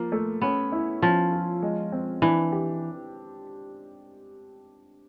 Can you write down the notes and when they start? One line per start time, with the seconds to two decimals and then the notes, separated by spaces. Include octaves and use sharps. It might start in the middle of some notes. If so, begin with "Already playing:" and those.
Already playing: F3 A#3
0.12 A3
0.41 B3 C#4
0.72 E4
1.02 F3 C#4
1.32 F4
1.62 G#3
1.92 C4
2.22 E3 D4
2.52 G4